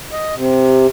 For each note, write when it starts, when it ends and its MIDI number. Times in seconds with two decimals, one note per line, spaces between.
0.13 0.35 75
0.36 0.87 48